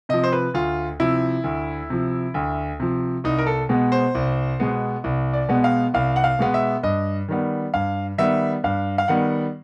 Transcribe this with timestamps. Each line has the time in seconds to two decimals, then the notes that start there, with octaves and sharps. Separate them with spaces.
0.09 C3 F3 D#5
0.24 C5
0.33 B4
0.54 D2 F4
1.00 C3 F3 E4
1.44 D2
1.90 C3 F3
2.34 D2
2.80 C3 F3
3.24 C2 D#4
3.38 A#4
3.47 A4
3.69 B2 G#3 B3
3.92 C5
4.15 C2
4.60 B2 G#3 B3
5.04 C2
5.33 D5
5.49 B2 G#3 B3
5.64 F5
5.94 C2 F5
6.16 F#5
6.24 F5
6.39 B2 G#3 B3
6.54 E5
6.83 G2 D#5
7.28 D#3 G3 B3
7.74 G2 F5
8.18 D#3 G3 B3 E5
8.64 G2 F5
8.98 F5
9.08 D#3 G3 B3 F#5